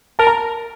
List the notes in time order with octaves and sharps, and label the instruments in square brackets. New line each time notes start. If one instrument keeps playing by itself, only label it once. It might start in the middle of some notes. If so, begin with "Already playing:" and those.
[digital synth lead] A#4 [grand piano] A5
[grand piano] A#5